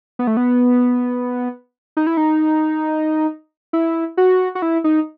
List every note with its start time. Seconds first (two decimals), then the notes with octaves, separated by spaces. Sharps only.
0.19 B3
0.27 A3
0.37 B3
1.97 D#4
2.07 E4
2.17 D#4
3.73 E4
4.17 F#4
4.55 F#4
4.62 E4
4.84 D#4